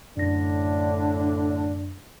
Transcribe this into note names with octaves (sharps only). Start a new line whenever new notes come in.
F#2 A2 D3 D4 A#6